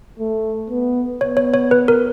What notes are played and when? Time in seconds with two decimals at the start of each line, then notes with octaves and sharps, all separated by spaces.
0.19 A3
0.70 B3
1.20 B3 C#5
1.37 C#5
1.54 C#5
1.71 B4
1.88 A#4